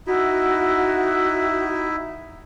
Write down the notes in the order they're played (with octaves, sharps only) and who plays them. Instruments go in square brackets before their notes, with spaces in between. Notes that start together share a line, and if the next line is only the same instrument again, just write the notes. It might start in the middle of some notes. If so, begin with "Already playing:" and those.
[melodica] D#4 E4 E5 [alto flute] F#4